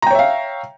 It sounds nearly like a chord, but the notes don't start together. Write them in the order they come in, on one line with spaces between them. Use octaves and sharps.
A#5 G5 C#5 E5 F5